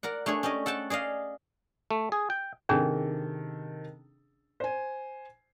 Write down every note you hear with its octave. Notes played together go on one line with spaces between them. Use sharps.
A#4 D5 F#5
A3 D4 G#4 C#5
C#4 G4 D5 D#5
A4 F#5 G5 A5
G#4 D5 D#5 F5
A3
G#4
G5
C3 D#3 C#4 D4 G#4 A4
C5 G#5